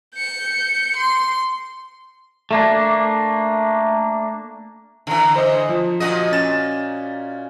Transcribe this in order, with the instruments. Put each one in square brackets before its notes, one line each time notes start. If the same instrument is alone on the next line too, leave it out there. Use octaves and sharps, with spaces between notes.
[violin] G6 C#7
C6
[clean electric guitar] A3 A#3 D4
[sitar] D3 E3
[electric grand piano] C5 D#5
F3
[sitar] A#2 F#4 D#5
[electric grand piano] C#4 A6 E7